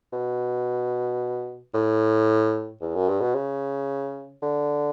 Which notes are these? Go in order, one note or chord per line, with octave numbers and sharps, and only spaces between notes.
B2
A2
E2
F#2
G2
B2
C#3
D3